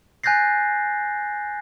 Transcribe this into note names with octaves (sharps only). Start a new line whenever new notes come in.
G#5 F#6 G6 A6 A#6 C7